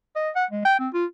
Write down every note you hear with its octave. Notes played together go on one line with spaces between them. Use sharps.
D#5
F#5
G#3
G5
C4
F4